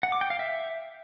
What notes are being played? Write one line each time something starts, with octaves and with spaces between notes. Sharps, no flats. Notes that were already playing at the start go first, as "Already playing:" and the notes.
F#5
D6
G5
F5
E5